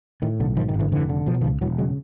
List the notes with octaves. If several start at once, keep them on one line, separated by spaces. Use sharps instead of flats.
A2 D#3
B1 D3
G#2 D#3 F3
D#3
G#1
D3 E3
F1 D3 E3
D3
B2 F3
F#3
D#3 F3
C#2
E1 E3 F#3
C#3 F#3 G#3